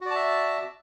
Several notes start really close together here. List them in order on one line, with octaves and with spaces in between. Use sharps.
F#4 D5 A5 E5